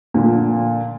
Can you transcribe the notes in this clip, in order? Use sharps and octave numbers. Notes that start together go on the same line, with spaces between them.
A#2 D3 F3